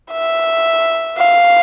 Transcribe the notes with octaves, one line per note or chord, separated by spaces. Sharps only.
E5
F5